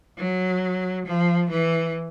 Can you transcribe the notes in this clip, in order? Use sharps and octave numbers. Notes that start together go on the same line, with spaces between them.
F#3
F3
E3